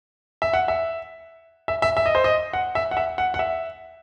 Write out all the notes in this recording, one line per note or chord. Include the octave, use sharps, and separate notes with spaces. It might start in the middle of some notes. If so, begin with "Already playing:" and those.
E5
F#5
E5
E5
E5
E5
D#5
C5
D#5
F#5
E5
F#5
E5
F#5
F#5
E5